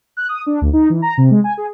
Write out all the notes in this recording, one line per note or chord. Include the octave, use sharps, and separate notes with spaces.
F#6
D#6
D4
D2
D#4
E3
A#5
C3
G#3
G#5
G#4